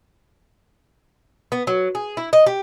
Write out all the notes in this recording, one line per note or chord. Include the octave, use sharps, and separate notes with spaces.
B3
F#3
G#4
E4
D#5
G4